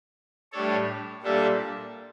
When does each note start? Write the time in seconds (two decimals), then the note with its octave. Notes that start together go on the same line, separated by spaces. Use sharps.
0.52 A2 G3 D4 A4 C#5
1.22 A#2 G3 D4 A4 E5